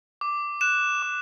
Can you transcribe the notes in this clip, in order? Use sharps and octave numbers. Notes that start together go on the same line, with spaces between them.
D6
F#6 E7
D6